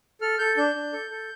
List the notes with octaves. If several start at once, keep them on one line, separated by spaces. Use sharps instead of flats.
A4 F6
A4 G6
D4 G6
D4
A4
A4